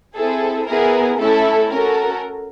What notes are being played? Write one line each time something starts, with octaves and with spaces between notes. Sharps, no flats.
C4 E4 G#4 A4
B3 E4 G#4 A#4
A3 C#4 E4 A4
C#4 F#4 A4 A#4